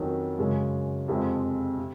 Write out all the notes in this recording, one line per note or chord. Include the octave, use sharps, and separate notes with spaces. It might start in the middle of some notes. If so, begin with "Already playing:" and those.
Already playing: F2 D#3 F#3 C#4
F#2 C#3 G#3 C#4
F2 C3 F3 G#3 C4
C3